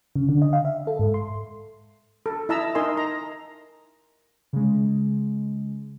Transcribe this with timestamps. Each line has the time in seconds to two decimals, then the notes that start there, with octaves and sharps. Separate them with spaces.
0.16 C#3
0.29 D3
0.42 D#5
0.53 F5
0.65 E5
0.87 A4
0.99 G#2
1.14 C6
2.26 A4
2.49 E4 D#5 E5 A5 A#5 E6
2.75 D#4 A#4 D#5 G#5 C6
2.97 A#5
4.53 C#3 G#3